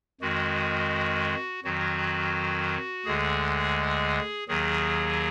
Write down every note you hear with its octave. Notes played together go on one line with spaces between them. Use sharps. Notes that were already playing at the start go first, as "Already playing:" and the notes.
F2 D#3 G#3 F#4
F2 D#3 F#3 F#4
D2 D3 G#3 G#4
D#2 D#3 F#3 G#4